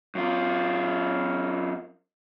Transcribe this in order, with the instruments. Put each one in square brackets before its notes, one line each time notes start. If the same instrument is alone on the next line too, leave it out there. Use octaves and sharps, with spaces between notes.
[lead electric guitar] F#2 F4